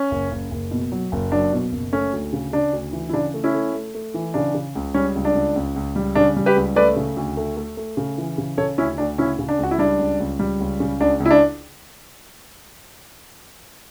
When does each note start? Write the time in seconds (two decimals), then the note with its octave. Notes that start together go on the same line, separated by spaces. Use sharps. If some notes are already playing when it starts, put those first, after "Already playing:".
Already playing: C#4
0.11 F#1
0.31 F#1
0.51 F#1
0.71 B2
0.92 F#3
1.12 F#1
1.32 F#3 D4
1.53 B2
1.72 F#1
1.93 A3 C#4
2.13 D2
2.33 C#3
2.53 C#3 D4
2.73 D2
2.93 E3
3.09 E4
3.13 C#3 D4
3.34 A3
3.44 C#4 E4
3.54 A3
3.74 A3
3.95 A3
4.14 E3
4.34 C#3 D4
4.55 C#3
4.75 C#2
4.94 G3 C#4
5.15 C#2
5.25 D4
5.35 C#2
5.56 C#2
5.76 C#2
5.96 G3
6.15 C#3 D4
6.37 G3
6.46 G4 B4
6.56 C#2
6.76 A3 B4 D5
6.96 C#3
7.17 D2
7.37 A3
7.57 A3
7.77 A3
7.97 C#3
8.18 E3
8.38 C#3
8.57 C#3 A4 C#5
8.78 D2 C#4 E4
8.98 D2 D4
9.18 C#3 C#4 E4
9.39 C#3
9.49 D4
9.59 C#2 F#4
9.71 E4
9.78 G3 D4
9.99 C#2
10.20 C#2
10.40 G3
10.60 C#2
10.80 C#3
11.00 C#2 D4
11.20 C#2
11.25 E4
11.31 D4